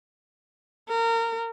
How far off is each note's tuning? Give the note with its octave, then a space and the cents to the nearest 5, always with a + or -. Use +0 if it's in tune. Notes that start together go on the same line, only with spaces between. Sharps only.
A#4 -25